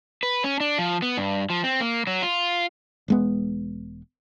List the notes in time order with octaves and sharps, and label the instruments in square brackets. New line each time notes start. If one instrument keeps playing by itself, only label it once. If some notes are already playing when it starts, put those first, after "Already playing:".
[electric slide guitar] B4
C#4
D4
F3
B3
G2
F3
C4
A#3
F#3
F4
[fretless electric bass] E1 G#3 B3